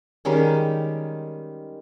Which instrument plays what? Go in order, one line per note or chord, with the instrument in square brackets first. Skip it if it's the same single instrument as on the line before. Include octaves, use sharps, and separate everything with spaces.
[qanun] D#3 G3 G#3 C#4